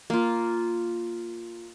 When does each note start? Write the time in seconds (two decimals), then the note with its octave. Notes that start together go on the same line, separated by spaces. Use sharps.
0.10 A#3 F4